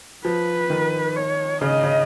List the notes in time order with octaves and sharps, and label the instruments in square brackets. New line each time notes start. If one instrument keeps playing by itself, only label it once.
[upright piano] F3 [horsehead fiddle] B4
[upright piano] D#3
[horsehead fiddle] C#5
[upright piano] C#3 [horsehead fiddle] D#5
[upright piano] C#3